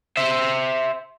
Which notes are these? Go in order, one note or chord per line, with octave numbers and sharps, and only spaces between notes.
C5 E5